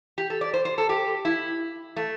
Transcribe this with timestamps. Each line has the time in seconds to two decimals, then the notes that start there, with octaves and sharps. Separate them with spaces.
0.18 G4
0.30 A4
0.41 D5
0.54 C5
0.65 C5
0.78 A4
0.89 G4
1.25 E4
1.96 A3